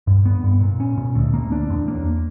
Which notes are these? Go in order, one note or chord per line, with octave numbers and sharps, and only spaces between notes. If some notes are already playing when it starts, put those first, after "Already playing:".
G2
B3
G2
A#2
C#4
A#2
D2
A#3
D4
E2
A#3